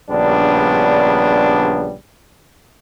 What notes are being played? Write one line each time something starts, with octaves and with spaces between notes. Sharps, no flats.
A#1 C#3 G3 B3 D4